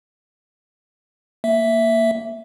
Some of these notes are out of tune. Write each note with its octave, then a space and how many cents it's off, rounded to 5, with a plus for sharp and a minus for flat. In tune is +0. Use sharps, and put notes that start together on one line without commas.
A#3 -10 E5 +0